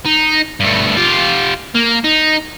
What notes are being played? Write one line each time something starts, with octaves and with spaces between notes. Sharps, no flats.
D#4
G2 A3
F4 G4
A#3
D#4